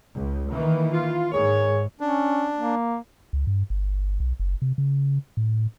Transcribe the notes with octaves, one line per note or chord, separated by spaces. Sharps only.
C#2
D#3 E3 A#3
F4
G#2 G#4 A#4 C#5
C#4 D4
A#3
C#2
G2
G1
B1
F#1
C3
C#3
A2